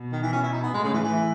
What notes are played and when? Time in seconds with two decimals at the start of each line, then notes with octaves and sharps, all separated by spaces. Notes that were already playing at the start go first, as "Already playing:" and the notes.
Already playing: B2
0.12 D#3
0.23 E3
0.33 C#4
0.43 E4
0.53 D#4
0.64 B3
0.73 A2 G#3
0.84 C#3
0.94 E3
1.04 E3